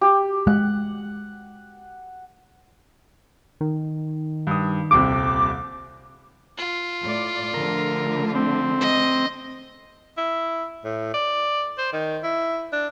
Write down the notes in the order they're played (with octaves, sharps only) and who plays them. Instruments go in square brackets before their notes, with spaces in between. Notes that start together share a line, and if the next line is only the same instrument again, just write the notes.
[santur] G4
[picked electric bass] G#3 [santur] F#5
[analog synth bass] D#3
[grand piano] G2 D#6
[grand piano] D#1 C2 C3 [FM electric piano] D6
[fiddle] F4
[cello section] A2 D5
[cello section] D3 F3 A3 [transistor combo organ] A#4
[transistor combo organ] C4
[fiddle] D#5
[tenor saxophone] E4
A2
D5
C5
D#3
E4
D4